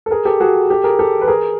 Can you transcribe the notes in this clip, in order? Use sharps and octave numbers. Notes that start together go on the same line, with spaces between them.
A4
G#4 A#4
G4 A4
F#4 G#4
G4 A4
G#4 A#4
G4 A4
B4
G#4 A#4